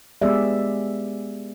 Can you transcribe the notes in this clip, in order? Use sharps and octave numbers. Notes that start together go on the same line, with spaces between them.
G#3 B3 G4 G#4 D5 E5